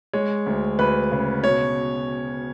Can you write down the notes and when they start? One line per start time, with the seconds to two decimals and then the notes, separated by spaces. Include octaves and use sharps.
0.13 G#3 C#5
0.46 D2
0.79 D2 B4
1.12 C#3
1.44 B2 C#5